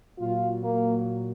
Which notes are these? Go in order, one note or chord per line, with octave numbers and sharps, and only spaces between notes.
A#2 F#3 F4
A#3